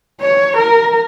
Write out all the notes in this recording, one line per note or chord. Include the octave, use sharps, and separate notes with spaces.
C#5
A#4